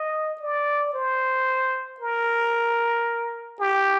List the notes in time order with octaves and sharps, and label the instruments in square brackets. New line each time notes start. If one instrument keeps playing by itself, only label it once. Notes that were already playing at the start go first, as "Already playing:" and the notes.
Already playing: [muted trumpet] D#5
D5
C5
A#4
G4